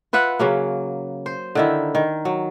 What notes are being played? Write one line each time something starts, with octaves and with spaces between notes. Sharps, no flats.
F4 B4 E5 F#5
C#3 F#3 A#3
C5
D3 D#3 E4
D#3
F#3